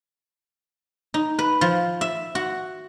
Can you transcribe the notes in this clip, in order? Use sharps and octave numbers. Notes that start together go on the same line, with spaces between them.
D#4
B4
F3
E5
F#4